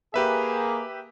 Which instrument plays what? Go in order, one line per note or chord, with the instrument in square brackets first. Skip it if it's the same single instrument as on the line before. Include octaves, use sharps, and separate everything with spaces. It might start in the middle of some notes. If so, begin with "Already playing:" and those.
[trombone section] A#3 G#4 [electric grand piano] G4 B4 E5